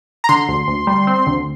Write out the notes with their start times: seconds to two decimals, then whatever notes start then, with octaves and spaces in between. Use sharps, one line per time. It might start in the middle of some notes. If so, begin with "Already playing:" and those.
0.24 A#5
0.29 D3 C6
0.48 D2
0.68 D2
0.87 G3
1.07 C4
1.27 D2